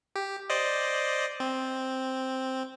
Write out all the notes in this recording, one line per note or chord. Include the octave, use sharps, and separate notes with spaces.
G4
C5 D5 D#5
C4